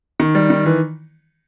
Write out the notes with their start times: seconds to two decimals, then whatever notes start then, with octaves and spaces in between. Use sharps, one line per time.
0.20 D#3
0.35 G3
0.50 D#3
0.66 E3